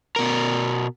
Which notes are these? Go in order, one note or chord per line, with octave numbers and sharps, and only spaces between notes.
B2 A#4